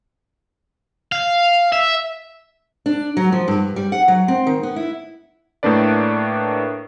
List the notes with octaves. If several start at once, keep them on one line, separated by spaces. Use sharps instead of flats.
F5
E5
D4
F#3
F3
G2
G3
F#5
F#3
C4
D#3
B3
E4
A2 A3 A#3 D4 B4 D5